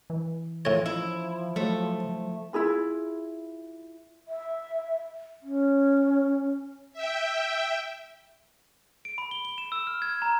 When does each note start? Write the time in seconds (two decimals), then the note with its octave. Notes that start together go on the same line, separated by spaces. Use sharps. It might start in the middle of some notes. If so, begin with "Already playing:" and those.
0.10 E3
0.65 A2 F3 C#5
0.86 F3 E4
1.56 F#3 A3
2.53 E4 F4 G#4 B5
4.28 E5
5.42 C#4
6.93 E5 G5
9.05 D7
9.18 B5
9.31 G7
9.45 G7
9.58 E7
9.72 E6
9.87 F6
10.02 G#6
10.22 A#5